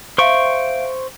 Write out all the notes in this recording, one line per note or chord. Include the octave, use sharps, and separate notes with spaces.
C5 E5 F5 C#6 D7